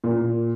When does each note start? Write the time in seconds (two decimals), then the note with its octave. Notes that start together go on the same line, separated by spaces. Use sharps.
0.04 A#2